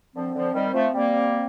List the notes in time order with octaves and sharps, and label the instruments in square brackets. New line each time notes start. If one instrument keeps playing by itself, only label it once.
[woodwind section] D3 F3 [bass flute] C4
[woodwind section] D3 F3
D#3 G3
F3 A3
G3 A#3